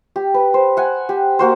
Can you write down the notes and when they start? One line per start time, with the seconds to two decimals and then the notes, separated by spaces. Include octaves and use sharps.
0.16 G4
0.34 B4
0.54 C5
0.77 F#5 G#5
1.09 G4
1.39 A#3 F#4 C5